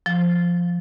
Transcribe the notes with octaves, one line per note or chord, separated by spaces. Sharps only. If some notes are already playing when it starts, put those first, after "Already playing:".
F3